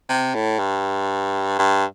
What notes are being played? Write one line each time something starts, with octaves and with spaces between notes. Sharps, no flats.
C3
A2
G2
G2